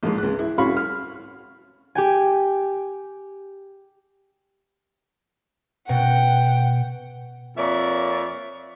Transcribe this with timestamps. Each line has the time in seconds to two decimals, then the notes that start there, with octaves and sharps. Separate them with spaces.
0.03 A#1 G#2
0.18 C#2 F#6
0.39 E4
0.58 C2 C#4 F#4 F5 B5 C#6
0.77 F6
1.95 G4 G5 G#5
5.89 B2 F#5 G5
7.57 F2 A#3 C#5 D5 E5